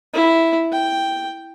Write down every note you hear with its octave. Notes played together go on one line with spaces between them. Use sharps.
E4
G5